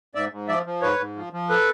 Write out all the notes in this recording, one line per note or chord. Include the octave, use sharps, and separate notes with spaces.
G#2 D5 E5
G#2
F3 D5 E5
F3
G#2 B4 C#5
G#2
F3
F3
A4 B4